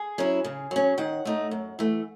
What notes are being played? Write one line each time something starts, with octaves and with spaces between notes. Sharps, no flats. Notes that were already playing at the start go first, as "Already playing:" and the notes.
Already playing: G#4
F#3 C#4 E4
C#3
F#3 C#4
D#3 F#5
A3 D#4
F#2
E3 A3